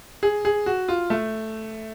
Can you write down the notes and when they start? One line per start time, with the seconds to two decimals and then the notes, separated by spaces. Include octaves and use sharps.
0.23 G#4
0.45 G#4
0.66 F#4
0.88 F4
1.10 A3